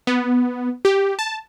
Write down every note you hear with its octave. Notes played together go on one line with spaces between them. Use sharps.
B3
G4
A5